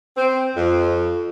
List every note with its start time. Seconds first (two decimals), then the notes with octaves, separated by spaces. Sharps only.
0.16 C4
0.55 F2